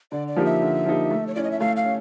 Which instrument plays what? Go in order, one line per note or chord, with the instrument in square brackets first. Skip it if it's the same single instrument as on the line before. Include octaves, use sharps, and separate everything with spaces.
[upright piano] D3 [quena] D5
[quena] D5
[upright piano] F3 A#3 D#4 G4
[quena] E5
[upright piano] D3
F3 A#3 D#4 G4
A3
[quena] C#5
[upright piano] C#4 E4 [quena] D5
[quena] D#5
E5
[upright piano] A3 [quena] F5
[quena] F5
[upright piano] C#4